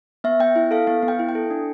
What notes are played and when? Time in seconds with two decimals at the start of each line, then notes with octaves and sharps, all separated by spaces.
0.24 B3 E5
0.40 B3 G5
0.56 E4
0.71 A4 F5
0.87 B3 F5
1.03 B3
1.08 G5
1.19 E4
1.29 G5
1.35 A4
1.50 D4